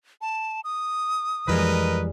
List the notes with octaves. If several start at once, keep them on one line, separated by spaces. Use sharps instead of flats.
A5
D#6
F2 E3 F3 G3 G#3 A#4 B4 D#5